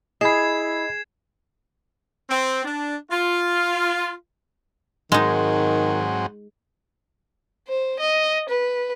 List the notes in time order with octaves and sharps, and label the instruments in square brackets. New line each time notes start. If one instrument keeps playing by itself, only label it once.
[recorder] E4 [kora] G#4 [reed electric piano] D#5 B5 [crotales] G#6 C7 E7
[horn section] C4
D4
F4
[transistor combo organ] G#2 F#3 C4 [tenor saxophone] D#3 [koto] G#3 D#4
[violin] C5
D#5
B4